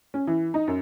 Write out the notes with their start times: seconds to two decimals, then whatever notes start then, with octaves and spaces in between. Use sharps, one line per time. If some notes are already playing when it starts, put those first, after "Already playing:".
0.14 C#4
0.27 E3
0.54 D#4
0.67 F#2